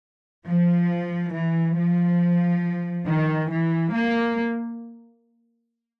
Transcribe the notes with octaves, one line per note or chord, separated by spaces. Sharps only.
F3
E3
F3
D#3
E3
A#3